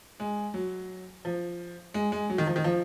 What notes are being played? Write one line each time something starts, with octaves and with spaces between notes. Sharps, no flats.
G#3
F#3
F3
G#3
G#3
F#3
D#3
F3
D#3
F3